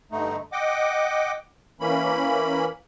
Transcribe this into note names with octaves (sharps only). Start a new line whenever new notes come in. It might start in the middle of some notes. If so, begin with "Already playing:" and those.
G2 D3 A3 D#4
D#5 F#5 G5 D6
E3 A#3 C#4 B5